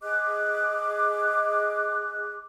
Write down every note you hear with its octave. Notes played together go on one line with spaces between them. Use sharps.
G#4 D#5 D6 F#6